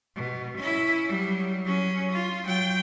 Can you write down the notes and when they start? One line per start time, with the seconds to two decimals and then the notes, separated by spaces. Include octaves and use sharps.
0.16 B2
0.58 C#4 E4
1.06 F#3 G3
1.65 F#3 C#4
2.12 F4
2.45 F#3 G5